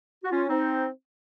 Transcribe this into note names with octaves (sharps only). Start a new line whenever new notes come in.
F#4
C#4 F4
C4 D#4